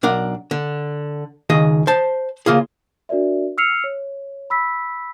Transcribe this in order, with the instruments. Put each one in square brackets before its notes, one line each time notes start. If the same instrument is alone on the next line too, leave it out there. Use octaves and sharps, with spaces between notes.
[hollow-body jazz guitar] B1 D4 A#4 F#5
D3
C#2 D#3 G#4 D#5
C5 A5
C#3 A#3 F4 G#4
[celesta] D4 F#4 A#4 D5 E5
E6 F6 C7 C#7 F7
C#5
B5 E6 B6